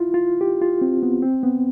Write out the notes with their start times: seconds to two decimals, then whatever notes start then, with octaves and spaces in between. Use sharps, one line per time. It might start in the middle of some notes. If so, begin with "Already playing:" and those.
Already playing: E4 F4
0.14 F4
0.41 G4
0.61 F4
0.81 C4
1.03 B3
1.22 C4
1.43 B3